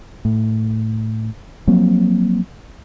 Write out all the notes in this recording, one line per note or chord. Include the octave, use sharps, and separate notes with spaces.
A2
F3 F#3 A#3 C4